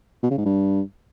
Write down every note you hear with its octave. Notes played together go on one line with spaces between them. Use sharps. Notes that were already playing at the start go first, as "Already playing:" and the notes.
B2
C#3
G#2
G2